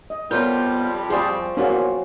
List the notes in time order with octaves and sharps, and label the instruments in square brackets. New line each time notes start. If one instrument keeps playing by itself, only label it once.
[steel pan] D#5
[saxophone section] F2 G3 [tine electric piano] B3 C5 G6 [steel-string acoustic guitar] F4 [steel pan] A#4 C#5
[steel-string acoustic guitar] F3 C4 [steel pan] G#4 D5 [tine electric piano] C5 C6 C#6
[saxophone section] E2 A#2 [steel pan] C#4 F#4 F5